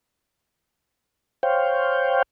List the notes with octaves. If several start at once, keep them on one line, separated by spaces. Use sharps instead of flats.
C5 C#5 F5 G5